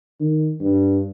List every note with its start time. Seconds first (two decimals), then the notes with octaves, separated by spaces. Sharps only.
0.20 D#3
0.61 G2